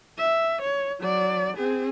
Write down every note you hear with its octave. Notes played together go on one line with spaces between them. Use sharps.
E5
C#5
F#3 D5
C4 G#4